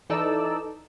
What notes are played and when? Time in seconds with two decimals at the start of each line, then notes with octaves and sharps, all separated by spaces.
0.10 E3 D#4 A4 D5 E6